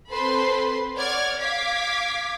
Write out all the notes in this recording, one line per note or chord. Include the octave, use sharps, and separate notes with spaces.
C4 A4 B4 C5 B5 C6
C#5 D5 F#5 F6 G#6
F5 D6 G#6 B6